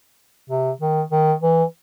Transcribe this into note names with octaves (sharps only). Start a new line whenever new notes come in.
C3
D#3
D#3
E3